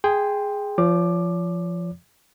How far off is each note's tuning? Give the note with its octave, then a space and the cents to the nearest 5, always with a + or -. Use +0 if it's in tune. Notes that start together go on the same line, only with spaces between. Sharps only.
G#4 +0 G5 +15 C6 +0
F3 -15 C#5 +40 D6 +20